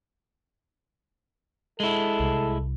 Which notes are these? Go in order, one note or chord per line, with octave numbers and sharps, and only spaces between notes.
G#3 E4 A4
C2